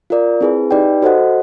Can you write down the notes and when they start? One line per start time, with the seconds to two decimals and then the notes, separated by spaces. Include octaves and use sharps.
0.10 F4 A#4 D5
0.41 C4 E4 G#4 B4
0.71 D#4 G4 B4 D5 G5
1.02 F#4 A4 C5 D#5 F#5